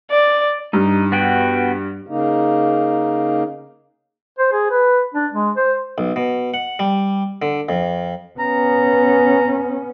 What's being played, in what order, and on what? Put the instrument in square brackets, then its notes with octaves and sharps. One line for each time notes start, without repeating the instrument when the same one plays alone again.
[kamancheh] D5
[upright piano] G2 [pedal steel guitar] D#4
[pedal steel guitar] B3 F#4 G5
[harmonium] C#3 A#3 D#4
[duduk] C5
G#4
B4
D4
G#3
C5
[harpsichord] B1
B2
F#5
G3
D3
F2
[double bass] B3 C#4 [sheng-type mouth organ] A#5